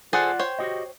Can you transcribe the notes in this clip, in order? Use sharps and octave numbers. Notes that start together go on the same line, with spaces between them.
F4 G#4 A4 C5 D5 F#5
C5 C#5 G5
F#4 G4 D#5